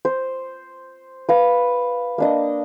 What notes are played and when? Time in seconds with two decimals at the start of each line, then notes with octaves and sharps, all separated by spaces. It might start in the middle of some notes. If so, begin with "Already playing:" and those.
0.05 C5
1.29 B4 F5
2.18 A#3 D4 D#5